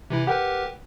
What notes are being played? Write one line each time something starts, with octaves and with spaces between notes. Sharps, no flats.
C3 E3 E4
G4 A#4 B4 F#5 G5